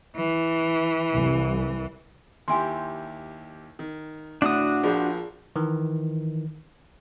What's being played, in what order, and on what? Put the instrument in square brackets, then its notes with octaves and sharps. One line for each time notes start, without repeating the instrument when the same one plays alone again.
[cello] E3
[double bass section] C2
[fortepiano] D#2 E4 G4 [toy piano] G#5 C6
[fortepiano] D#3
[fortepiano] A2 D3 [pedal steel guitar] D4 F#4 D#6
[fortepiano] A#1 F3 [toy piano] F4 G#4 D5
[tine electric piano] D#3 E3